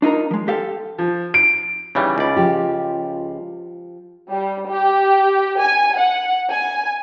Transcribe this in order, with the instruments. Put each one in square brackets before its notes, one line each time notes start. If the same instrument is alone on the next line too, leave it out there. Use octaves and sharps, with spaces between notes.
[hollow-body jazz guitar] D4 D#4 F4 A#4 A#5
F3 G#3
G4 A4 F5
[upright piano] F3
D7
[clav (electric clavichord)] C#3 E3 G3 [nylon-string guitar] D#4
[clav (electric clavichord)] C#2 D5
[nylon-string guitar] F3 G4
[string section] G3
G4
G#5
F#5
G#5